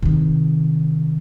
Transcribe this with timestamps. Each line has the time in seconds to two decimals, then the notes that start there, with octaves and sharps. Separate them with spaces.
0.02 C3 D#3